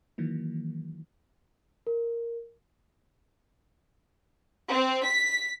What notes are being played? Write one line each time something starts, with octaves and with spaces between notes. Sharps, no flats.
D#3 E3 F#3 A#3
A#4
C4
B6